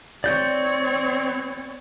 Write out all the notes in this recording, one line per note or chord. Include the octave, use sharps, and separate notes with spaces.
C4 C#5 D5 G6